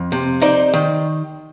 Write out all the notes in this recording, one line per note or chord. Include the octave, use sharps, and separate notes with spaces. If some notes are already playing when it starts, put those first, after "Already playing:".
Already playing: F2
C3
D#4 C5 D5
D#3